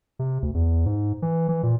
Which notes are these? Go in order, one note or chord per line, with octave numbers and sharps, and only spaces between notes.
C3
D2
E2
G#2
E3
E3
A#2